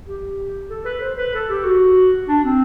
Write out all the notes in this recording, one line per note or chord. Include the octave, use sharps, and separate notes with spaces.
G4
A4
B4
C5
B4
A4
G4
F#4
D4
C4